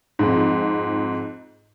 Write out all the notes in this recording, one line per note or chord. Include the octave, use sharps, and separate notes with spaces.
F2 G#2